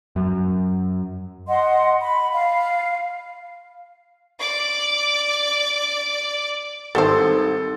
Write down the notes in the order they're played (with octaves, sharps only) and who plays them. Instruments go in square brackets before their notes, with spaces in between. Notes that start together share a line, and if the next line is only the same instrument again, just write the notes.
[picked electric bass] F#2
[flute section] D#5 F#5 C6
B5
F5
[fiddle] D5 D6
[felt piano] G#1 [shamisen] G3 E4 C5 [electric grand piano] A4